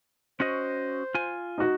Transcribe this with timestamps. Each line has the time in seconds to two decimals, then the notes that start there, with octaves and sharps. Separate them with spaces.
0.40 C#4 F#4 C5 D#5
1.15 F4 G#5
1.58 D#4 F#4